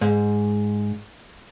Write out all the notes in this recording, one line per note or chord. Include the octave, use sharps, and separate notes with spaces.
G#2